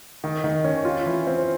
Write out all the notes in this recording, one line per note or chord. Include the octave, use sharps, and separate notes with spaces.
D#3
D#3
C#4
F4
E3
C4